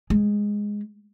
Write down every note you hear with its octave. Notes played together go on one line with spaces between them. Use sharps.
G#3